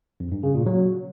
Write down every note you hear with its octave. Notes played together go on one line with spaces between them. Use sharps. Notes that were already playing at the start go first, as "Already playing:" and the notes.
F2
G2
C#3
A#2
F#3